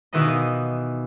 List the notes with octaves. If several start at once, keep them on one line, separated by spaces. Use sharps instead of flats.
B2 D#3 E3 F4 D#5